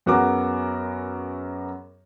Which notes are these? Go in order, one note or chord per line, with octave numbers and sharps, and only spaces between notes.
F#2 B3 F#4 G#4 A#4 D6